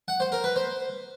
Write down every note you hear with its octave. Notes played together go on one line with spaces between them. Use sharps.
F#5
C5
A#4
B4
C5